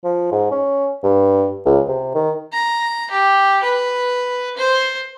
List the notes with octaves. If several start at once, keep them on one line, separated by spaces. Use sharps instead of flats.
F3
G#2
C#4
G2
C#2
C3
D#3
A#5
G4
B4
C5